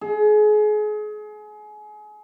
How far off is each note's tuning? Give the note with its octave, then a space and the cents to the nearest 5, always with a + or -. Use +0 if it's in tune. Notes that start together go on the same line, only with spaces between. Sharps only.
G#4 +30